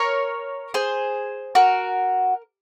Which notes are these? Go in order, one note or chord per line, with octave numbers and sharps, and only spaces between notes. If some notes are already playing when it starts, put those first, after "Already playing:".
Already playing: A#4 C#5
G#4 C5
F#4 A#4